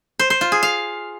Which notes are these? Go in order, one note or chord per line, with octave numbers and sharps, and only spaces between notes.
C5
C5
F4
G#4
F5